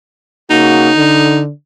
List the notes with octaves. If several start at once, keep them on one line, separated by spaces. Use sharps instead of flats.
C#3 A#3 D#4 F#4
D3